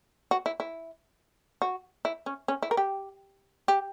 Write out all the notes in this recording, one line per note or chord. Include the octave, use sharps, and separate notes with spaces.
F#4
E4
E4
F#4
E4
C#4
C#4
E4
A#4
G4
G4